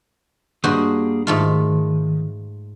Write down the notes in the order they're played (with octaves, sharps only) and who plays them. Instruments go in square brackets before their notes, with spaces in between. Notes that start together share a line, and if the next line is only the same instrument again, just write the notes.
[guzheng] G2 F#4 C5 [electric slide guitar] A#3 G#4
[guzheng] G#2 A3 F4 [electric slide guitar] D#3